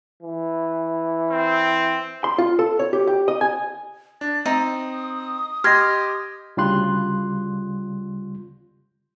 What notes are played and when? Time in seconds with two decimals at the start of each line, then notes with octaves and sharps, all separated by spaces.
0.22 E3
1.31 C4
2.24 C6
2.38 F4
2.59 A4
2.79 C#5
2.93 G4
3.07 G4
3.28 D#5
3.41 G#5
4.21 D4 A6
4.46 C4 D#4 D#6
5.64 G4 D#5 C6 F6 G#6 A#6
6.57 D2 C#3 G3 F4 C6 F#6